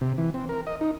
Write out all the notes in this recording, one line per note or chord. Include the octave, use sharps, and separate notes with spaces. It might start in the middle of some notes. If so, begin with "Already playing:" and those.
C3
E3
C4
A#4
D#5
D#4